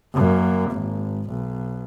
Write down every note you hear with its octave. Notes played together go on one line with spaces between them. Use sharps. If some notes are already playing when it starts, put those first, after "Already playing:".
F#2 A#3
G#1
B1